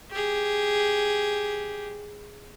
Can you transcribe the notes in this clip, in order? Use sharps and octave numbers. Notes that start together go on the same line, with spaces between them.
G4 G#4